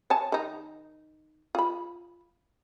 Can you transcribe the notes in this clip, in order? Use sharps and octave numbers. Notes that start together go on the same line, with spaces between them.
C#5 G#5 A5
D#3 D#4
F4 B5